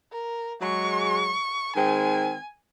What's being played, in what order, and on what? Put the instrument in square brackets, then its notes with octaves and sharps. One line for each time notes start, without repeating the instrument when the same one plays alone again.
[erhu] A#4
[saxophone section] F#3 G#3 [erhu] C#6
[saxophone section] D#3 G#3 C4 [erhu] G#5